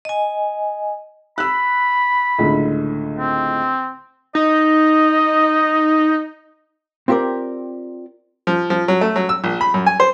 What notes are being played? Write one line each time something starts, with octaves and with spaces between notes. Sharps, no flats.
D#5 G#5
B5 E6 F#6
C#2 A2 D3
C4
D#4 D#5
C4 F4 G4 A#4 D5
F3
F3
F#3
A3
F#3
E6
A#1
B5
F#2
G#5
C5